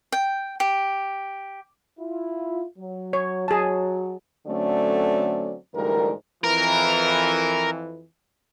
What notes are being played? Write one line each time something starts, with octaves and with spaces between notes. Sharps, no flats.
G5
G4
E4 F4
F#3
C#5
F#3 G#4 A5
D3 F#3 A3 C4 C#4 D5
D2 G#2 E3 G3 A#4
F2 E3 A#4